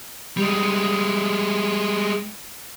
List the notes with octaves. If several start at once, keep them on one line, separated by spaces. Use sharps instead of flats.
G3 G#3